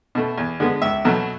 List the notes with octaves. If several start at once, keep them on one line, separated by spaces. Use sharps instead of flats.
B2 A3
E2
D3 G#3 B3
C#2 E5
B2 F#3 A3